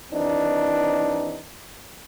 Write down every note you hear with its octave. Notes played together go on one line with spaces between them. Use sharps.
D#2 E3 C4 D4 D#4